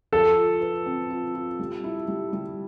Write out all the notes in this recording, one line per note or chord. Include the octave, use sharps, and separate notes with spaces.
F3 A4
F4
B4
C4
F4
F4
G3
E4
G3
G3